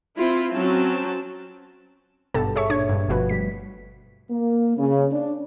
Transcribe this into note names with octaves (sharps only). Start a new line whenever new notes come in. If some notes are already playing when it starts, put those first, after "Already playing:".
C4 E4 F4
F#3 C4 C#4 A5
G#1 G2 B2 G4 A4 A5
G#4 A4 C#5 E5 C#6
A#2 D4 C#5 C#6 G#6
G2 G3
G1 B2 F3 A3 F#4 B4
G3 B6
A#3
C#3
D4